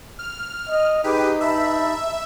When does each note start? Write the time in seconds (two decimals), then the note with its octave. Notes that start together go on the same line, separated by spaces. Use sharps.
0.19 F6
0.69 D#5
1.04 D#4 G4 G#4 B4
1.41 G2 E5 A5 B5